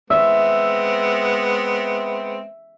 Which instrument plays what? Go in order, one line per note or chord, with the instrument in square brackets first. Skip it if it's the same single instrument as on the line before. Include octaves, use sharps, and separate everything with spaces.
[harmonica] G#3 B3 C4 [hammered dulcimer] E5